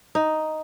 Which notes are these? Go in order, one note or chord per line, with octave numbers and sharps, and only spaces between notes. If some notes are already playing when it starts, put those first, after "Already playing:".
D#4